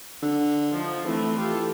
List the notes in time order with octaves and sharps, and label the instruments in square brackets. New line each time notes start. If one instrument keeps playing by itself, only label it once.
[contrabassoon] D3
[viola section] F3 D#4
[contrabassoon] E3 [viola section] A3 C4
[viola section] F4 G4 A4